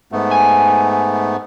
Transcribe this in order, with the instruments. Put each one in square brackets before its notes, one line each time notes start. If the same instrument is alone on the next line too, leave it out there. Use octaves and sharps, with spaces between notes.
[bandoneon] G#2 A3 B3
[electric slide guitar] G#5